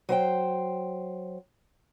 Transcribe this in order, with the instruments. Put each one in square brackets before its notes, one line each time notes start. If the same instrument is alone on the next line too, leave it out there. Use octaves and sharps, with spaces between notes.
[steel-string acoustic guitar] F#3 C5 G5